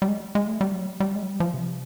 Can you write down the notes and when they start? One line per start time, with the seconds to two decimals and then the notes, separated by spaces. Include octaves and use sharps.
0.02 G3
0.08 G#3
0.35 G#3
0.48 A3
0.61 G3
0.74 F#3
1.00 G3
1.15 G#3
1.23 F#3
1.28 G3
1.40 F3
1.54 C3